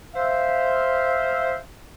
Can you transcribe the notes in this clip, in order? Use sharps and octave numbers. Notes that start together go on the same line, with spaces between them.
C5 E5 F5